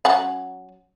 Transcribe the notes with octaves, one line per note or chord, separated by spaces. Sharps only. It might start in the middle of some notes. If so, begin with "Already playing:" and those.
F#3 C#4 F#5